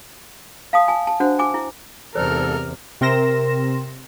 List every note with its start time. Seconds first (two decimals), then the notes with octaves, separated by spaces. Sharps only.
0.73 F5 A5 D#6
0.88 G#5 A5
1.07 A5
1.20 D4 F#4 C5 F#5
1.39 G#5 D6
1.54 E4
2.15 E2 G#2 C3 A4 A#4 C5 D5 F6
3.01 C3 C4 A#4 C6 A#6 E7